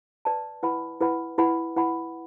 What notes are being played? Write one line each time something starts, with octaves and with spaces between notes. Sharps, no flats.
B4 D5 A5
E4 B4 F#5 B5
E4 B4 F#5 B5
E4 B4 F#5 B5
E4 B4 F#5 B5